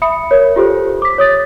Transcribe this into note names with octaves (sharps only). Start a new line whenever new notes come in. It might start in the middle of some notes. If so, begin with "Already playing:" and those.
E5 B5 D#6 C#7
A#4 C#5
F4 G4 A4 C5
D6 B6
C#5 D#6 A6